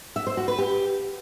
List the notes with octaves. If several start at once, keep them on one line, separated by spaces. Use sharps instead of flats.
E5
C5
F#4
B4
G4